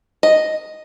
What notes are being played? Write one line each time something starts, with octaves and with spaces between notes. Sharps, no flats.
D#5